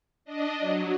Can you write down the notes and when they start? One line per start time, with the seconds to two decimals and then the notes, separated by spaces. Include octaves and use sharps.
0.25 D4 D#5
0.60 F#3